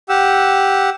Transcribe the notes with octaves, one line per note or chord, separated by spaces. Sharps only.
G4 F#5 E6